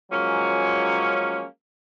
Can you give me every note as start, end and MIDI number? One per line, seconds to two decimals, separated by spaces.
0.12 1.44 53
0.12 1.44 54
0.12 1.44 56
0.12 1.44 58
0.12 1.44 61